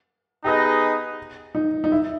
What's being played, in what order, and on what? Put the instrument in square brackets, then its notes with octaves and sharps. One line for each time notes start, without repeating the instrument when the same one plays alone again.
[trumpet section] B3 D#4 G#4 B4 D#5 [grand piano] G4
[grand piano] D#4
D#4
E4